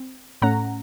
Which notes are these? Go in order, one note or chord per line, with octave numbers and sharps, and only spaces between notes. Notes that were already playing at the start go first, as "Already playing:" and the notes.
Already playing: C4
A2 A3 C#4 F#5 A#5